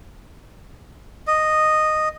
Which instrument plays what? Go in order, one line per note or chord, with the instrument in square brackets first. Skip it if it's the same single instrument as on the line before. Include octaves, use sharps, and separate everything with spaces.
[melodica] D#5